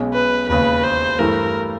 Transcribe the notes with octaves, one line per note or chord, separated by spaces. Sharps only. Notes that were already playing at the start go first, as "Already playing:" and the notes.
Already playing: B1 B2 G#3 C#4
B4
E1 D#2 C#3 B4
C5
G2 E3 A3 A#4